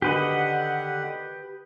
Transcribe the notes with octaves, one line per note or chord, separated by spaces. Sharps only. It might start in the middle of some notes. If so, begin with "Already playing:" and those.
D3 D#3 G4 B4 D#5 F#5